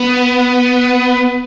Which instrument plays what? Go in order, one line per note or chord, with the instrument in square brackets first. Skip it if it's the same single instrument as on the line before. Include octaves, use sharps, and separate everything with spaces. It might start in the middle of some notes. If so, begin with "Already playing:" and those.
Already playing: [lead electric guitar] B3